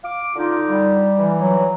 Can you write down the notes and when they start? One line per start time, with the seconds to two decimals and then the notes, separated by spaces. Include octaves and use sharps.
0.03 F5 D6
0.36 D3 D#4 F4
0.68 G3
1.17 E3
1.40 F#3